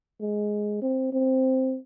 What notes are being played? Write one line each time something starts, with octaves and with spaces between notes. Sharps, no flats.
G#3
C4
C4